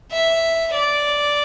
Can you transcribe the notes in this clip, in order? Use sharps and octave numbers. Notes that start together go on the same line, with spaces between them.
E5
D5